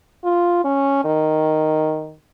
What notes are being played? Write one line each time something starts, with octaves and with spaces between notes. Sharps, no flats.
F4
C#4
D#3